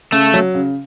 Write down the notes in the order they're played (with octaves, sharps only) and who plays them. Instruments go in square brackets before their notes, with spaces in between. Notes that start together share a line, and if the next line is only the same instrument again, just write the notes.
[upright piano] C#3 [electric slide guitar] A3
[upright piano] F#3
C#3